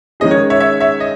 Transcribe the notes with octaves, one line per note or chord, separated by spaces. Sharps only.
D#3 G#3 C#4 G#4 D#5
C#5
C#5 E5
C#5 E5
C#5 E5
D#5